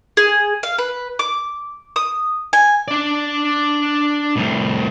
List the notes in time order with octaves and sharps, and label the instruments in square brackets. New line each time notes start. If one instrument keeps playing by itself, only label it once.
[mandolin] G#4
F5
B4
D6
D#6
G#5
[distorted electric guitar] D4 D5
C2 A2